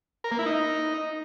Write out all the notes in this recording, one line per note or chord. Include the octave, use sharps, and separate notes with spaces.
A#4
A#3
E4
D#4